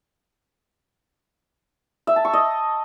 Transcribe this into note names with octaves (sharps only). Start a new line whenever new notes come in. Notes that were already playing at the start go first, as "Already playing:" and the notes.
E5
A5
C#6
D#5